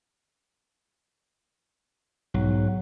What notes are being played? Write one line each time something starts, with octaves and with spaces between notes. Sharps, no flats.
B1 G#2 F#3